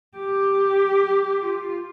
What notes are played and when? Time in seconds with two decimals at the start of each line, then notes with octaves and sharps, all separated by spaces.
0.17 G4
1.41 F4